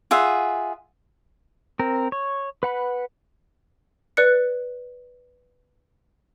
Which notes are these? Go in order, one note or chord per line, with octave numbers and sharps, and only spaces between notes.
F4 G#4 E5 F#5
C4 A#4
C#5
B4 F#5 B5
B4 D5 F#6 C#7